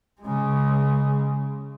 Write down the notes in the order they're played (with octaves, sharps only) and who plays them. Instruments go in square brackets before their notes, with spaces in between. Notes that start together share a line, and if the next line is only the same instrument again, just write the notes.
[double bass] C#3 G#3